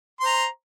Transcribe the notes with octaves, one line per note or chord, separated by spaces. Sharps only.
C5 A#5 C6